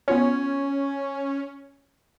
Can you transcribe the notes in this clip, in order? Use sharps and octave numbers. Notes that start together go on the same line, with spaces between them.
B3 C#4 F4 C#5